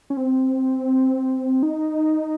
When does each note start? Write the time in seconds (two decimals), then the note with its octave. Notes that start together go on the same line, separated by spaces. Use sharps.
0.10 C#4
0.17 C4
1.63 D#4